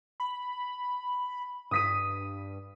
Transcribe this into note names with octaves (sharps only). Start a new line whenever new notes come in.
B5
G2 D#6 B6 D#7